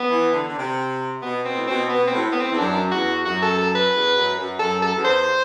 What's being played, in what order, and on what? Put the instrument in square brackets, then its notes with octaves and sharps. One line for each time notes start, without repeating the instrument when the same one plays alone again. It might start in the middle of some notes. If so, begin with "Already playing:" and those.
Already playing: [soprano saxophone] B3
[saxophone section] E3
D3
D3
C3
[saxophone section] B2 [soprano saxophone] B3
[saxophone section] B2 [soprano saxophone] C4
[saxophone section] A2
[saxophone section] B2 [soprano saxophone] C4
[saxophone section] B2 [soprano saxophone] B3
[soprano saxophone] C4
[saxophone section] A2
[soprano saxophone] B3
C4
[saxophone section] E2
[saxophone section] F#2 [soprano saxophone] D4
[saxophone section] E2 [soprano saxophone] F#4
[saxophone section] F#2 [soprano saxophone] F#4
[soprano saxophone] A4
A4
B4
[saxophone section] E2
F#2
F#2
[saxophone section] F#2 [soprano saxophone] A4
[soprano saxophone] A4
[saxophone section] E2
[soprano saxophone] C5